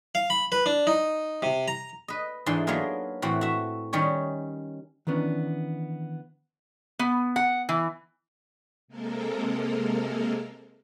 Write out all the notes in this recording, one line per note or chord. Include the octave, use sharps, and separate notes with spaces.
F5
B5
B4
D4
D#4
C3
A#5
B4 D#5
G#2 E3 D4 D#4 A4 C6
F#3 A#3 B3 F4 G#4 A#4
A2 E3 C4 F#4
F#4 E5
D#3 G3 C#4 C#5
D#3 E3 B3 C#4 D4
B3
F#5
E3
C3 G#3 A#3 A4 A#4